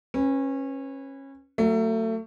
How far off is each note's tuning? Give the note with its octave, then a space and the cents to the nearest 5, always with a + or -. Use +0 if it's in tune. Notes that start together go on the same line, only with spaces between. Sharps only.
C#4 -25 B4 +0
F#3 +0 A3 +30